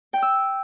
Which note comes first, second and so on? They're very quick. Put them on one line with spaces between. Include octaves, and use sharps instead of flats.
G5 G6 E6